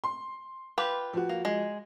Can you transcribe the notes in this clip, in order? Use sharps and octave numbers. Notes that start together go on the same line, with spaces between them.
C6
F4 G4 B4
F3 F#4
A#3
G#3